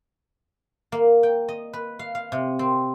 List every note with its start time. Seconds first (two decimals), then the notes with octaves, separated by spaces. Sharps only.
0.92 A#3
1.23 G5
1.48 D#5
1.73 B4
1.99 F5
2.15 F5
2.32 C3
2.59 C4